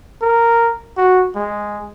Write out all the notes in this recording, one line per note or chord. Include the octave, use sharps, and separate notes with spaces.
A#4
F#4
G#3